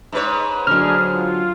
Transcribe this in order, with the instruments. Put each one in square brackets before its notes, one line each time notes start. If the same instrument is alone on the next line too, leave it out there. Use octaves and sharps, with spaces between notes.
[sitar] G#2 B4 C#5
[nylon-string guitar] D3 F#3 [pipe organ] D4 G#4 [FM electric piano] F6
[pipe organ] F4